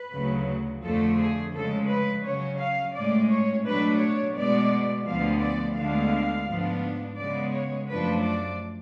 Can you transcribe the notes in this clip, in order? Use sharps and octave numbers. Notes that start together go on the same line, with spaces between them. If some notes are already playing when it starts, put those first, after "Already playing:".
Already playing: B4
D2 C#3 F#3
F2 D3 F3 A3 A4
G#4
C#3 F3 G#3 A4
B4
C#3 F#3 C#4 C#5
F5
A2 G#3 C#4 D5
C#5
B2 F#3 A3 D4 B4
C#5
B2 G#3 B3 D5
D2 D3 F3 B3 F5
D5
D2 D3 G#3 B3 D4 F5
G#2 F3 B3 D4
C#3 G#3 B3 D5
C#5
F#2 F3 A3 D4 B4
D5